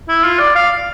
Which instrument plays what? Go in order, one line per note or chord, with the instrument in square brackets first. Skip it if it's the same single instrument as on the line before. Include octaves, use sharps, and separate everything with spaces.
[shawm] E4
F4
D5
F5